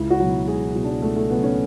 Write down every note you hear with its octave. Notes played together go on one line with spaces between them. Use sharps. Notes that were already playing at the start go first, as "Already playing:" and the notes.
Already playing: C#2 E4
F#4
B2 F#3
E4
C#2 G#4
E4
B2 F#3
D4
C#2 A3
A3
B2 F#3 B3
C#4